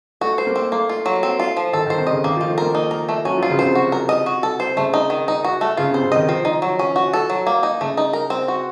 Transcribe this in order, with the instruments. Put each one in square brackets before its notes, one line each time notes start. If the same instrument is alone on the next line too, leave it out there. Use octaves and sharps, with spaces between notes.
[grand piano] A3 [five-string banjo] F#4
[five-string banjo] C5
[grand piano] A#3
[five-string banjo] C4
[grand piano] A3 [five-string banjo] A#3
[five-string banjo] F4
F#3
C4
F4
F3
[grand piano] D#3 [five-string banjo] A4
[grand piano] D#3 [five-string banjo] C5
[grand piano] C3
[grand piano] C#3 [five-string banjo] D#5
[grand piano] D#3 [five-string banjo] A#3
[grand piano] F3
[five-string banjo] F4
[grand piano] A3
[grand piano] A#3 [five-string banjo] A#4
[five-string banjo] D#4
A#4
A3
[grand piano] F#3 [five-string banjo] C#4
[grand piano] F3
[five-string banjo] F4
[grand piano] C#3
[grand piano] C3 [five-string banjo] C5
[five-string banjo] F#4
A#4
D#5
F#4
A4
C5
[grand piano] C#3 [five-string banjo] A3
[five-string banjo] D#4
D#3
D#4
F#4
A3
[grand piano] C#3 [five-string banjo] F4
[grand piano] C3
[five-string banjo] C5
[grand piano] C3
[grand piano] D#3 [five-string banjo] D#5
[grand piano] F3 [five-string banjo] C4
[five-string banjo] D#4
F#3
C#4
F#4
A4
F#3
A#3
D#4
[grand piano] C#3 [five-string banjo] A3
[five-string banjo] D#4
A#4
C4
F#4